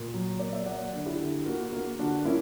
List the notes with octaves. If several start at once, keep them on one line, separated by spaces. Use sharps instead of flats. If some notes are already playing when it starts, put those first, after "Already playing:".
Already playing: A#2
F#3
A#3 D5
E5
A#3 D5 F#5
D3
E4 G4
D3
A#3 F#4 A#4
A#3 F#4 A#4
D3 D4 F#4
A#3 C#4 E4